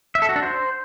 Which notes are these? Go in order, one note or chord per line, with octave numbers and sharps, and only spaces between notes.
E5
A4
F#4
D4
C5